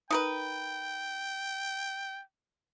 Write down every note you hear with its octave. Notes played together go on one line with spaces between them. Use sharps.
D#4 A#4 B4 G5